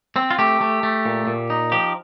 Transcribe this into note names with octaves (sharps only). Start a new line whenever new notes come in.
C4
F4
A3 G4
A3
A3
A#2
A#2
D#4
F3 G4